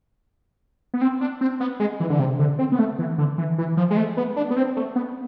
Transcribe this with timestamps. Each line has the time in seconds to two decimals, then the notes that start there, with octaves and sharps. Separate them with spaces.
0.94 B3
1.01 C4
1.21 D4
1.41 C4
1.60 B3
1.80 G#3
2.00 E3
2.10 D3
2.19 C3
2.39 D3
2.59 C4
2.72 B3
2.79 A3
2.99 E3
3.18 D3
3.38 E3
3.58 E3
3.77 F3
3.90 G#3
3.97 A3
4.17 B3
4.36 D4
4.50 B3
4.56 C4
4.76 A3
4.96 B3